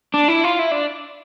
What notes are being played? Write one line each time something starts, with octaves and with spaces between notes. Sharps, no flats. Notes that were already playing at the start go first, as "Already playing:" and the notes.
D4
E4
F4
E4
D4